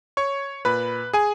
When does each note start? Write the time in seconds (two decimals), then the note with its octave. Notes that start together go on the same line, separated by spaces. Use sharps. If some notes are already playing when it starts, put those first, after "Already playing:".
0.17 C#5 C#6
0.65 A#2 B4 B5
1.13 G#4 G#5